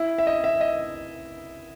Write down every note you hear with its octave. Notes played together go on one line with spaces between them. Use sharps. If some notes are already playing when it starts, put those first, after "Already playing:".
Already playing: E4
E5
D#5
E5
D#5